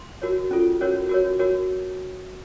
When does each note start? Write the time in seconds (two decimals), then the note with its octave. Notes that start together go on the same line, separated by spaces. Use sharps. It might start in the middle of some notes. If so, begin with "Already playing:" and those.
Already playing: C6
0.22 F#4 A#4 C#5
0.51 C#4 F4 A4
0.81 C#4 F#4 A#4 C#5
1.09 F#4 A#4 C#5
1.39 F#4 A#4 C#5